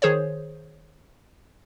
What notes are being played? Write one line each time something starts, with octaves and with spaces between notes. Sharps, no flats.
D#3 G#4 C5 C#5